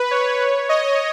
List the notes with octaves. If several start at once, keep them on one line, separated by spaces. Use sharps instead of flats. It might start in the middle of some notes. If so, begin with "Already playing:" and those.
Already playing: B4
C#5
D#5